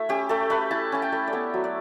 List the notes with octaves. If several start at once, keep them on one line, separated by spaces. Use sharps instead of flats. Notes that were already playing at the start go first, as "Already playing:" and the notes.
Already playing: A3 E4 E5
C#4 G4
A3 A4
A3 B4
E4 A5
C#4 A5
G5
A3
D5
B3 C#5
F#3
D5